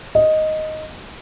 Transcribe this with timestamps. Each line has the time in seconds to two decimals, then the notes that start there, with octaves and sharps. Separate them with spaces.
0.15 D#5